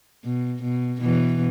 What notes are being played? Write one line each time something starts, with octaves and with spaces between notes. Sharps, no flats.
B2
B2
B2 E3